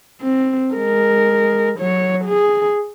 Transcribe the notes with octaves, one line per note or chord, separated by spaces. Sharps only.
C4
G#3 A#4
F#3 C#5
G#4